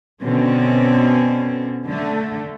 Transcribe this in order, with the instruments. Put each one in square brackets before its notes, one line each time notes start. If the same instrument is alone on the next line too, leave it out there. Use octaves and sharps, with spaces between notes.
[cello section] B2 D3 C4 C#4
D3 A3